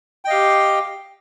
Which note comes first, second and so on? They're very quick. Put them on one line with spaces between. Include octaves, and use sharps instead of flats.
G5 D#5 F5 G4